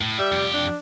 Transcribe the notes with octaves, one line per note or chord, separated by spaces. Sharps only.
A2
G3 E5
F2 G4
D4